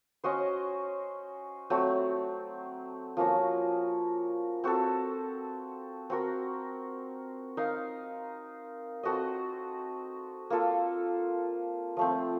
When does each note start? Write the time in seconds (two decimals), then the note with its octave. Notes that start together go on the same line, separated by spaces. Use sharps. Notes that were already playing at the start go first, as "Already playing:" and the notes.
0.24 C#4 F#4 C5 D#5
1.70 F#3 A3 C4
3.17 F3 A#3 C#4 F#4
4.64 C4 F#4 A4
6.10 C4 F#4 A#4
7.57 D#4 A#4 F5
9.03 C4 F#4 A4 D#5
10.50 A#3 F4 A4
11.97 F3 A3 C4